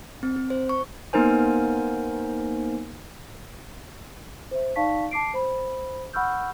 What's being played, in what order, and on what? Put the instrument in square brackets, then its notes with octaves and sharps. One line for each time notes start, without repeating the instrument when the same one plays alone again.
[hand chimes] C4
C4
C5
C#6
[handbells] A#3 B3 D#4 A#4 C5 G#5
[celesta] C5 E5
D#4 D5 F5 A5 C#6 B6
A5 D6 C7 D7
C5 B5
F#5 B5 C#6 E6 F6 G6